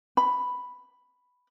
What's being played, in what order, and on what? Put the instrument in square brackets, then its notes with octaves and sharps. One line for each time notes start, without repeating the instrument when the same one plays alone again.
[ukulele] B5